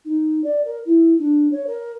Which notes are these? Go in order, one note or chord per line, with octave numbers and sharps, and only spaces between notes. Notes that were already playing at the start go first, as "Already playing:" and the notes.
D#4
D5
A#4
E4
D4
C#5
A#4